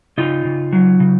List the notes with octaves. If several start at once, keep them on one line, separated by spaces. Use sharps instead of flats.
C#3 D#4 F4
C#3
F#3
C#3